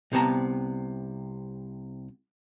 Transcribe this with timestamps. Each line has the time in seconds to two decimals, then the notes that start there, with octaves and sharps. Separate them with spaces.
0.12 C2 C3 B3 A5 A#5